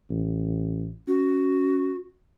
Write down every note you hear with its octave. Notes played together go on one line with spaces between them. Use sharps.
A1
C#4 F#4